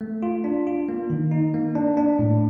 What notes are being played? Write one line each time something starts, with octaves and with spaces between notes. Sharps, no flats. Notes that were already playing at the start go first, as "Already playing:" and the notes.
A3
F4
D4
F4
A#3
D#3
D#4
A#3
D4
D4
A2